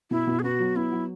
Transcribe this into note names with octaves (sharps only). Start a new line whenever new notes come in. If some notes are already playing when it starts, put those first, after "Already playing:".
B2 E4
B2
G#4
B3 F#4
F#3
B3 E4
F#3